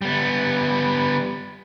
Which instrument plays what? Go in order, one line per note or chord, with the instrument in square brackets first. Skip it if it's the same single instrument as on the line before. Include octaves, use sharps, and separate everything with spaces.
[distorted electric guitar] G3 B3